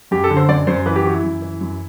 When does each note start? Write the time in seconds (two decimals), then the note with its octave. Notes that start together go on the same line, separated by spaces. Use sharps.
0.11 F#2 G4
0.24 A4
0.30 D3
0.37 C5
0.48 F#2 D5
0.67 F#2 C5
0.86 E3 B4
0.96 G4
1.05 E3 F#4
1.14 E4
1.24 F#2
1.42 E3
1.61 F#2